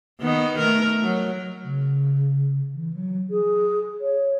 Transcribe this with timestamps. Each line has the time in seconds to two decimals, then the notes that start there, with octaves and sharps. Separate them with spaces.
0.21 D#3 B3 D#4
0.58 A3 A#4
1.03 F#3
1.63 C#3
2.73 E3
2.93 F#3
3.30 G#4
4.00 C#5